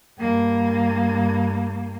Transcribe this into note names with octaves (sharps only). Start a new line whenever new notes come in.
G2 A#3